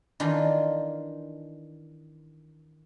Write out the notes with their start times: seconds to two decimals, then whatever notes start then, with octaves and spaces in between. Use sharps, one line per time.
0.20 D#3 E3 D4 F4